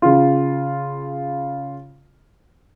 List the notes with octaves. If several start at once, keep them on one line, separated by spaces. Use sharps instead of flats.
C#3 F4